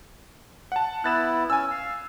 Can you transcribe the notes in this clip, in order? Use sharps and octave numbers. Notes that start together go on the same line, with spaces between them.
F#5 A5
B3 E4 F#6 A6 E7
C#4 G#5 E6
F5